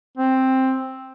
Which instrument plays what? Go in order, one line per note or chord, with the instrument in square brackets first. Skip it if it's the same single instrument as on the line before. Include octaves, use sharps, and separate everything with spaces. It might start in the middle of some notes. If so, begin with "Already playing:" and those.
[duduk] C4